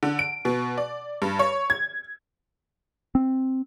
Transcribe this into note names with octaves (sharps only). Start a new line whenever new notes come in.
D3
D7
B2
D5
G2
C#5
G#6
C4